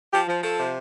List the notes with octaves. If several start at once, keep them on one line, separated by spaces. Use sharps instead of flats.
F3 G4
F3
F3 A4
C3